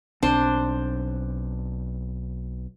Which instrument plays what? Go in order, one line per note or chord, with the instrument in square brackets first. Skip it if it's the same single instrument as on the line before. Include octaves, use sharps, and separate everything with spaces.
[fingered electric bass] B1 C4 [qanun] D4 C5